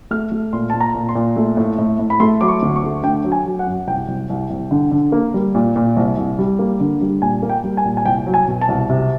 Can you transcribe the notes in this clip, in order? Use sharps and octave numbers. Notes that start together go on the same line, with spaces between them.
A3 F6
A3
A#2 C6
A#2 A5
A#5
A#2
C6
A#2
A3
A2
A2
A2
B5
A3 C6
F#3 D6
C#6
D2
C#6
A3
D3 G5
F#3
G#5
F#3
F#5
F#2
C2 G5
C2
C2
C2
D3
D3
A#3
G3
A#2
A#2
C2
C2
G3
A#3
D3
G3
A#2 G#5
A#3
G5
G3
G#5
A#2
G#5
C2 G5
F#3
G#5
B2
A5
C2
C3